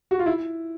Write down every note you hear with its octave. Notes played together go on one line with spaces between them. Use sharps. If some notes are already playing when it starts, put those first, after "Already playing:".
F#4
F4
E4